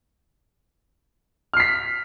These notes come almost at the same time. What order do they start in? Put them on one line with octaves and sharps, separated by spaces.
F6 C7 B6